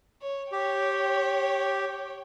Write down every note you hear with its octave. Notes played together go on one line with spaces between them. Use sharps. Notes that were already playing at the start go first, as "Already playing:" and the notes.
C#5
G4 C#5 G5